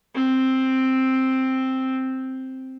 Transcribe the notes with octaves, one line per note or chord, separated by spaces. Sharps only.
C4